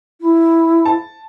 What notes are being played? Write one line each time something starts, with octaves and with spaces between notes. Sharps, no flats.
E4
A5